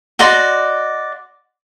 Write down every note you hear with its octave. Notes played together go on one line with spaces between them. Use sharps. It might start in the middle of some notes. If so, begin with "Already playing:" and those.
F#4 D5 D#5 C6